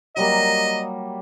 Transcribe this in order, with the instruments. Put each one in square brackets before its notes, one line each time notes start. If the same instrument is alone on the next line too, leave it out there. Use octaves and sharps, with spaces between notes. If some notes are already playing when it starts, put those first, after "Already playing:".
[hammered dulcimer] F#3 G3 A#3 [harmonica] D#5